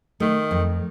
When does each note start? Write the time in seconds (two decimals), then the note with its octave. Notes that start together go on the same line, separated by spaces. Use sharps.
0.20 D#3 A3
0.51 F2